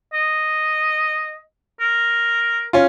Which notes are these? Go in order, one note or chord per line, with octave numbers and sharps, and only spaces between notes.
D#5
A#4
C#4 F4